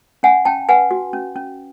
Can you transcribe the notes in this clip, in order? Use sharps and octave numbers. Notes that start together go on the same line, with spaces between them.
C#4 F#5 G#5
C#4 G5 A5
B4 F#5 G#5
F#4
C#4
C#4